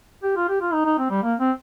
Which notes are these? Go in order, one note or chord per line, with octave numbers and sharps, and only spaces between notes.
G4
F4
G4
F4
D#4
D#4
C4
G3
A#3
C4